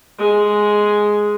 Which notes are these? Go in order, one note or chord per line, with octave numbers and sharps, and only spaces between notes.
G#3 G#4